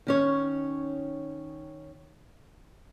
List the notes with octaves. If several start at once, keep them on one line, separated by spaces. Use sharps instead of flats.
D#3 C#4 C#5